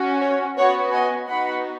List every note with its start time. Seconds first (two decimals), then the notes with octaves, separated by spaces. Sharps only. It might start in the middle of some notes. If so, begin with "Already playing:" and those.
Already playing: C#4 F#4
0.22 C#5
0.57 B3 F#4 C#5 F#5
0.92 D#5 G#5
1.28 B3 D#4 F#4 F#5 B5